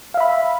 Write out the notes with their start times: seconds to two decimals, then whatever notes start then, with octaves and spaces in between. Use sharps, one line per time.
0.14 F5
0.17 E5
0.20 B5